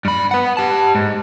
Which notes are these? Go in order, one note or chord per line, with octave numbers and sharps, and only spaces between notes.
G2 B5
B4 F#5
G4 A5
G#2